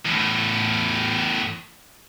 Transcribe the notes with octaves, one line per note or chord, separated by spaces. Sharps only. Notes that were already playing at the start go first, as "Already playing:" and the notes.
E2 A2